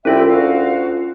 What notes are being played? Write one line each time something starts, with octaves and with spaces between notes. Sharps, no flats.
C2 C#4 E4 F4 A4 E5 G5
D2 F#4 F5